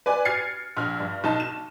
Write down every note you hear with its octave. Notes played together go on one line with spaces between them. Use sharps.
B4 D5 G#5
F6 G#6 A6 C7 C#7
A#1 F6
G2
B1 D#4 A5
E7